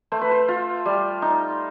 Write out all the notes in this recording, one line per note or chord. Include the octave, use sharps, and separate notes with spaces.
A3 C5
B4
C5
F4
G3
D#4